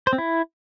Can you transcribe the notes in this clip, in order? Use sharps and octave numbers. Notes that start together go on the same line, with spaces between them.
C5
C4
E4